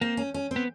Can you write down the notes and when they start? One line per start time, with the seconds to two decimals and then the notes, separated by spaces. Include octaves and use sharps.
0.01 A#3 C4
0.17 C#4
0.34 C#4
0.51 C4
0.56 B3